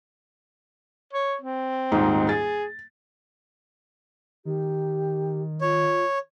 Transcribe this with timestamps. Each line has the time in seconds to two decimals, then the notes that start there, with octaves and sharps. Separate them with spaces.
1.13 C#5
1.42 C4
1.92 D#1 G#2 D#4
2.29 G#4 A6
4.45 D#3 G4
5.61 F4 C#5